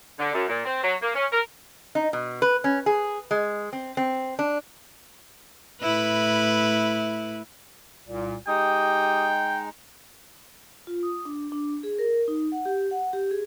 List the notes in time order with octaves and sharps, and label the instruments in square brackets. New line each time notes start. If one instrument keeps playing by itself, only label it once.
[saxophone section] D3
F#2
A#2
C4
F#3
A#3
C#4
A#4
[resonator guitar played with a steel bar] D#4
B2
B4
C#4
G#4
G#3
C4
C4
D4
[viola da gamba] A2 E4 B4
[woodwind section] C2 A#2
[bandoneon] G#3 D#4 [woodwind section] G4 D#6 [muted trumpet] G5
[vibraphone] F4
D#6
D4
D4
G#4
A#4
D#4
F#5
G4
F#5
G4
G#4